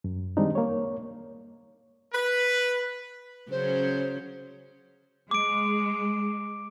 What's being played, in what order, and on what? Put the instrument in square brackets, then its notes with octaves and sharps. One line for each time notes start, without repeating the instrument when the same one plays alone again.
[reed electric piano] F#2
D#3 G3 G#3 C4 D4 D#4
A#3 C#5
[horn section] B4
[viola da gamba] C#3 F#3 C#4 [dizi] C5
[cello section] G#3 [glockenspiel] D6 D7